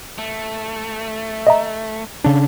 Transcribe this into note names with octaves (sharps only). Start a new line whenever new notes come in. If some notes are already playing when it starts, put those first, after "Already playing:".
A3
D#5 E5 A#5
C#3 D4